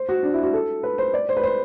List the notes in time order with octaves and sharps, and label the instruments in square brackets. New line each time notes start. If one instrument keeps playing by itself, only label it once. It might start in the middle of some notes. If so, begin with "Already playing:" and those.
Already playing: [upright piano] C5
F#4
D4
E4
F#4
A4
B4
C5
D5
C5
B4
C5